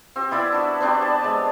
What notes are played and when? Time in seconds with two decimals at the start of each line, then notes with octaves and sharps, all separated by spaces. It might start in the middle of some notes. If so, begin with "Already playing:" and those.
0.16 C4 G4
0.31 B3 E4 D5 E5
0.52 D4 F#4
0.81 B3 C4 D4 G4
1.02 D5 A5
1.21 G#3 D5